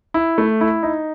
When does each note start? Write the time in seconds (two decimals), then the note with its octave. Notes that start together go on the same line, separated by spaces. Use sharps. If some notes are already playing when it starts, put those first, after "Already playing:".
0.14 E4
0.38 A3
0.61 E4
0.83 D#4